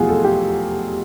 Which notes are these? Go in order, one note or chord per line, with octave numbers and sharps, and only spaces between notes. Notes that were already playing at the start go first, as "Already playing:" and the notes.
Already playing: F1 E2 B2 F#3 F4 F#4 G#4
A4
G4